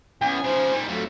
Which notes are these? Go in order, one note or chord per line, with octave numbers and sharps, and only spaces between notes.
E2 B3 C#4 G#5
C#3 F3 C5
D#3 G3
F2 F#3 G3 A3